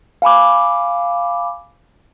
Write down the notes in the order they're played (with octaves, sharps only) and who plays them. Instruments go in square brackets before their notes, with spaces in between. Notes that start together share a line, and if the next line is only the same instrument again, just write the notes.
[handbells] F5 G#5 B5 D6